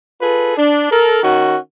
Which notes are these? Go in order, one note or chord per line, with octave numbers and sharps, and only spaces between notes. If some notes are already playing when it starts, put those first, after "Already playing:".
F4 G#4 A4 B4
D4
A4 A#4
D#3 C#4 F#4